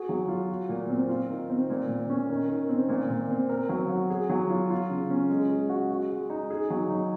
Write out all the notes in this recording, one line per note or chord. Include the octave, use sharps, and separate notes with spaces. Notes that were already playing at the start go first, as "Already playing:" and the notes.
Already playing: F#4 G#4
F#3
F4
F#4
A#2
C4
F4
D#3
C4
A#2
A#2
C#4
D#3
D#3
C4
A#2
A#2
C4
A#4
F#3
F#4
G#4
F#3
F4
F4
C#3
C#4
G#3
G#3
F#4
F#4
G#3
D#4
G#4
F#3
D#4